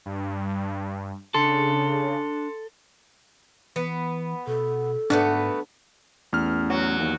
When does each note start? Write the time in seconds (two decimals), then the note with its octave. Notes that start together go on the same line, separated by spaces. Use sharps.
0.06 G2
1.34 C#3 D4 A4 C6 C#7
3.76 E3 B3
4.47 B2 A4
5.10 G#2 A3 B3 D4 F#4
6.33 A1 E2 F6
6.70 F#3
6.99 D#2